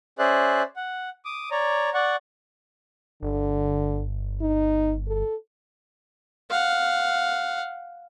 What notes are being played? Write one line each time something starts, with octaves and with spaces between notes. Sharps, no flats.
C#4 G#4 C5 D5 E5 F#6
F#5
D6 D#6
C#5 D5 A#5
D5 F#5 C#6
G1 D3
D#4
A4
F5 F#5